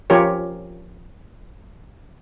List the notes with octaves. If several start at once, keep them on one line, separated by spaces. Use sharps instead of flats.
F3 C#4 F4 G4 A#4 C#5